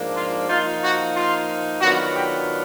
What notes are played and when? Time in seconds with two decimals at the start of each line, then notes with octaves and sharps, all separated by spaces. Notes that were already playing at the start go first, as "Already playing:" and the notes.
Already playing: G#2 F3 A#3 D4
0.17 F4
0.49 F3 A#3 D#4 F4
0.83 F#4
1.16 F4
1.81 D#3 F#3 B3 D4 F4 F#4
2.15 G4